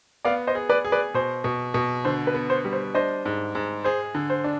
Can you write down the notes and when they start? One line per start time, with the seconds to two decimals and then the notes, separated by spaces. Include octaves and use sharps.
0.25 B3 D5 F5
0.47 C5 D#5
0.55 G#4
0.69 B4 D5
0.85 G#4
0.92 B4 D5
1.14 B2 C5
1.44 B2
1.74 B2
2.05 D3 C5
2.27 B4
2.34 B3
2.50 C5
2.65 G3
2.73 C5
2.95 D4 C5 D#5
3.25 G#2
3.55 G#2
3.84 G#4 C5
4.15 D3
4.30 C5
4.44 D4